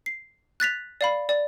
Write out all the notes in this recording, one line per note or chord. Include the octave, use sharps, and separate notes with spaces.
C7
F#6 A6 B6 F7
D5 F5 B5
D5